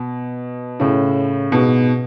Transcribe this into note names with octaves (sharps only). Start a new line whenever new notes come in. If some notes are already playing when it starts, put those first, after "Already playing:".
Already playing: B2
A2 C#3
G#2 B2